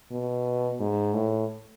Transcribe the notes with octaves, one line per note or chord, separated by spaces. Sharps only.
B2
G#2
A2